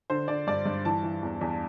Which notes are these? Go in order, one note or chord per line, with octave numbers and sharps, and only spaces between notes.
D3 C5
D3 D5
G2 D5
G2
E3 A5
E3
E2
E2